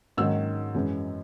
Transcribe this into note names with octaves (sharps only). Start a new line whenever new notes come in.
G#2 D#3 F#3 A#3 C#4 E6
F#2 E3 G#3 C#4